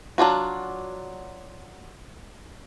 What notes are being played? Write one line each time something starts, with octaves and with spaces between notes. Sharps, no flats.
F#3 D4 F4 F#4